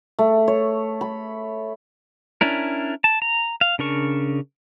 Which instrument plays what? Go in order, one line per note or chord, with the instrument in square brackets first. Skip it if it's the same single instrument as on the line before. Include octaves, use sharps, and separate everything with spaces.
[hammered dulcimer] A3
C#5
B5
[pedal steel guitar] C#4 D4 E4 A#4
A5
A#5
F5
C#3 D4 A#4 C#6